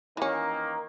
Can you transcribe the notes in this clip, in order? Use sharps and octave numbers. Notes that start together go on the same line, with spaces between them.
D#3 E3 A#3 C#4